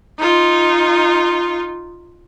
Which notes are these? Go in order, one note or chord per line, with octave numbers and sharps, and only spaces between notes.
D#4 F4